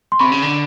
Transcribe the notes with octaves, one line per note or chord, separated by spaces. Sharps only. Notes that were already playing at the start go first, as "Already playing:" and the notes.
C6
C3 B5 C#6
C#3
D3